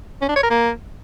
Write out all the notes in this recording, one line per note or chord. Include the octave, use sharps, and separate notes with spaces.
C#4
D4
C#5
A#4
A#3